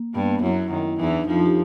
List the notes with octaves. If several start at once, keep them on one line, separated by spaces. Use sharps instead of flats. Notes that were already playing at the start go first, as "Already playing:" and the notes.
Already playing: A#3
G2 G3 B3
F#2 F#3 E4
D#3
E2 E3 D#4
D4
D#4
F2 F3 F4
G4